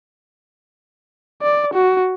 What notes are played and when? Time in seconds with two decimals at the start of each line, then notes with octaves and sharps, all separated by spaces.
1.42 D5
1.74 F#4